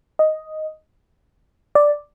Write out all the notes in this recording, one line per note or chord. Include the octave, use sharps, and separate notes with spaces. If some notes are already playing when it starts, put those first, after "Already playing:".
D#5
D5